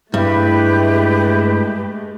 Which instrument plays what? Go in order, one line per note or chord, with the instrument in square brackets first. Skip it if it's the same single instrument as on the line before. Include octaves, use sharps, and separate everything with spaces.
[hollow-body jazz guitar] G2 [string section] G#3 A3 [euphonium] E4 [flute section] G4 B4